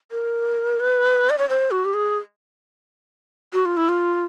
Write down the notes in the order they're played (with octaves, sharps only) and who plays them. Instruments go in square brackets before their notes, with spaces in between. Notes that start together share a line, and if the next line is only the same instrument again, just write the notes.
[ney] A#4
B4
D5
C#5
C5
F#4
G4
G#4
F#4
F4
E4
F4